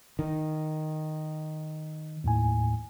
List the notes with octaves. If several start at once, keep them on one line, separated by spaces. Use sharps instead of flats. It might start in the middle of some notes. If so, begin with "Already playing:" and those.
D#3
D#2 A2 G#5